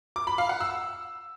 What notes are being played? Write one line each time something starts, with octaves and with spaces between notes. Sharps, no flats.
D6
B5
F5
F#5
E6